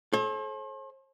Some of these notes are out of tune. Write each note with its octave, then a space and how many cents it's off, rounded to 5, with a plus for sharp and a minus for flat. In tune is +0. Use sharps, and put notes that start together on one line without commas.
A4 -35 C5 +45